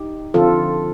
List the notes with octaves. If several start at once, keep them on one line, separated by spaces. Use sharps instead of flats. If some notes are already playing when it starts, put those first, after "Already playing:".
Already playing: D#4 G4
D3 F3 C4 F4 A4